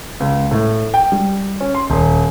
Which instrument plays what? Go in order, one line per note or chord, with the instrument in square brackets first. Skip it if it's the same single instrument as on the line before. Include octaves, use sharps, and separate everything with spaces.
[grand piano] C#2
A2
G5
G3
C#4
C6
D#1